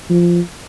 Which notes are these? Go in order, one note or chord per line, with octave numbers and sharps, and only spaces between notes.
F3